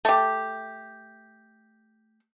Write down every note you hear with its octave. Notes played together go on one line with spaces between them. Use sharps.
A3 G4